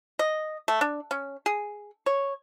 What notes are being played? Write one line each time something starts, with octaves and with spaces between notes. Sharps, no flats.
D#5
A3
D4
C#4
G#4
C#5